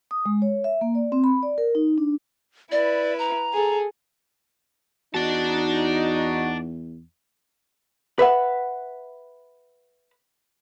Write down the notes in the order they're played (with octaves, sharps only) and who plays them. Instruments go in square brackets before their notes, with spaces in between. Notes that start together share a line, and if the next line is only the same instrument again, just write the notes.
[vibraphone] D#6
G#3
C#5
E5
A#3
D5
C4
B5
D5
A#4
D#4
D4
[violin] E4 B4 [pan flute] D5
[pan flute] A#5
[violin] G#4 A4
[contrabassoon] E2 [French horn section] D#4 [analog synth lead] F#4 [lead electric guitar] D5 A5
[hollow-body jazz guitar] B4 E5 F#5